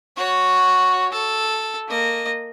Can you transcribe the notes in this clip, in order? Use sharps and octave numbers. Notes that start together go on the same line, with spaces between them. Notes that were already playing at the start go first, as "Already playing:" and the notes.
F#4 C#5
A4
A#3 D#5